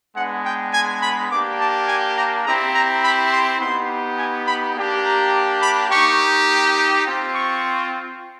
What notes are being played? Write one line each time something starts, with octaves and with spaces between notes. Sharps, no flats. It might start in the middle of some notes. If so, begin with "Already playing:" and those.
G#3 B3 D4 F#5
G5
G#5
B5
A#3 D4 G4 D6
A5
G#5
A#5
C4 E4 G4 A#5
A#5
B5
C6
B3 D#4 G4 C6
G#5
B5
A#3 D4 G4
A#5
B5
A#3 D#4 G4 C#6
C4 F4
C#6